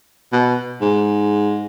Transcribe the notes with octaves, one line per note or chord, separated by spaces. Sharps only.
B2
G#2